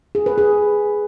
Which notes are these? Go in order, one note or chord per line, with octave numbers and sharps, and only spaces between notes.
G#4
B4
G#4